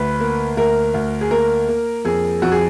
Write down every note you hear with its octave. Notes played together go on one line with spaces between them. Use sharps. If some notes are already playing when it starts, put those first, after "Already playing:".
Already playing: D2 B4
A#3
D2 A#4
D2
G#4
A#3 A#4
A#3
F2 G#4
F2 F#4
G#4